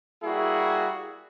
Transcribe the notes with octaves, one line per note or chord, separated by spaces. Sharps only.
G3 A#3 E4 F#4 G#4